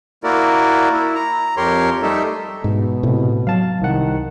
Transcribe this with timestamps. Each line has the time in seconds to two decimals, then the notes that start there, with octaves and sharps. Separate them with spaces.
0.24 A#3 E4 F#4 A#4 D5
0.93 E4
1.15 A#5
1.57 F2 G4 A#4 C#5 C6
2.03 G3 A3 D#4 A4 E5
2.64 G#2 B2
3.03 A2 C3
3.47 F#3 F5 A5
3.81 C2 D#3 F#5